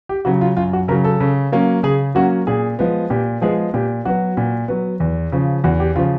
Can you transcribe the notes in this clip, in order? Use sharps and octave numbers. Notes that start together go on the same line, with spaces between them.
G4
C#3 F#3 F#4
F4
F#2 F4
F#4
C#3 F#3 A#4
A4
C#3
F#3 A#3 C#4
C#3 G#4
F#3 A#3 C#4 F#4
A#2 G#4
F3 G#3 B3
A#2 G4
F3 G#3 B3 G#4
A#2 G4
F#3 B3 F#4
A#2
F#3 B3
E2
C#3 F3
E2 F#4
G4
C#3 F3 F4